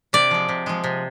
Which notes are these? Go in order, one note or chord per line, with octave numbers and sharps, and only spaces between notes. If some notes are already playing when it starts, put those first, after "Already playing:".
C3 D5
F3 G#3
C3
F3 G#3
C3